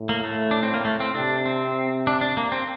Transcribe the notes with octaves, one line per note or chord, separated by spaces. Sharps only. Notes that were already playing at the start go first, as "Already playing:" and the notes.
Already playing: A2
A#3
A3
D4
C4
A#3
A3
C4
C3 D4
C4
D4
D4
A#3
C4